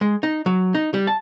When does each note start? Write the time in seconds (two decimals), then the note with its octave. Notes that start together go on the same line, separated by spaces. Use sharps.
0.01 G#3
0.23 D#4
0.46 F#3
0.75 D#4
0.94 G3
1.07 A5